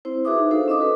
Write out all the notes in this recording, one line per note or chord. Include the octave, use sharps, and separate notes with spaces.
C4 E4 C5
F#4 G#4 B4 E5 D6 D#6
D#4
D4 E4 A4 C5 F5
C#4 D#5 D6 D#6
F#4 A4 B4